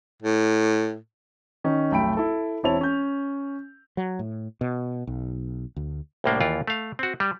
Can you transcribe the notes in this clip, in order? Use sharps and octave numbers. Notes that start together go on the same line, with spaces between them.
A2
D#3 C#4 D#4
F1 B1 A3 G5 B5 D7
E4 A4
E1 C4 E4 C#5 A5 F7
C#4 G6
F#3
A2
B2
B1
D2
C2 A2 A#3 D4
D#2 E3 F4 D5
A3 F5
C4 F#4
G3